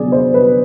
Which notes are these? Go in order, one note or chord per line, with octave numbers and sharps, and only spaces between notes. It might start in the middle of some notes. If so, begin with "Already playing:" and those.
Already playing: D3 F#3 B3 D4 G#4 D5
C5
B4